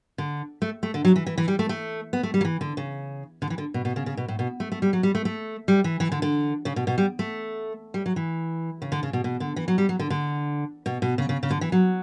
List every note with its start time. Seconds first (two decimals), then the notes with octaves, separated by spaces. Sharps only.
0.18 D3
0.62 A3
0.83 A3
0.94 D3
1.05 F#3
1.16 E3
1.26 E3
1.38 E3
1.48 G3
1.59 A3
1.69 A3
2.13 B3
2.23 A3
2.34 G3
2.41 F#3
2.45 E3
2.61 D3
2.77 C#3
3.42 D3
3.50 E3
3.58 D3
3.74 B2
3.85 B2
3.96 C#3
4.06 C#3
4.17 B2
4.28 A2
4.39 B2
4.60 A3
4.72 A3
4.82 G3
4.93 F#3
5.03 G3
5.15 A3
5.25 A3
5.68 G3
5.84 E3
6.00 E3
6.12 D3
6.22 D3
6.65 C#3
6.76 B2
6.87 B2
6.98 G3
7.19 A3
7.94 G3
8.06 F#3
8.16 E3
8.82 C#3
8.92 D3
9.03 C#3
9.13 B2
9.24 B2
9.40 D3
9.56 E3
9.68 F#3
9.78 G3
9.89 F#3
10.00 D3
10.10 D3
10.86 B2
11.02 B2
11.18 C#3
11.29 C#3
11.43 C#3
11.51 D3
11.61 E3
11.72 F#3